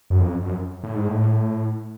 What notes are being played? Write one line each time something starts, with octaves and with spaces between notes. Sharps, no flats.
F#2
F2
F#2
A2
G#2
A2